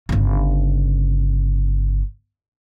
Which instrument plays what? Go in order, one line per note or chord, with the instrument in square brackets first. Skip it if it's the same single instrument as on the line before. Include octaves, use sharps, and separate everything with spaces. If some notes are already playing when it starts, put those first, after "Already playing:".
[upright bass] G1 C#3